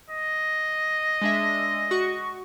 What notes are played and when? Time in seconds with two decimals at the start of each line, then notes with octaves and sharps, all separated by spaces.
0.10 D#5
1.22 G#3 D4 E5
1.91 F#4 C#6